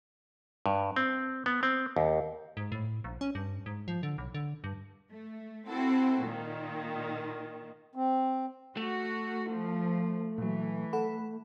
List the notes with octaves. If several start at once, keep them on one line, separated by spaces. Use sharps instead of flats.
G2
C4
B3
C4
D#2
G#2
A2
A#1
C#4
G2
G#2
F3
D3
B1
D3
G2
A3
C4 E4 F#4 A4
A#2 D#3
C4
A3 F#4
F3
A#2 E3 F#3
A4 F#5 B5